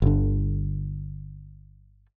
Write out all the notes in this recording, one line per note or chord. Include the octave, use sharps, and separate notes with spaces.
G1 D3